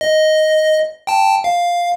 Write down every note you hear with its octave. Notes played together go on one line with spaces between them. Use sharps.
D#5
G5 A5
F5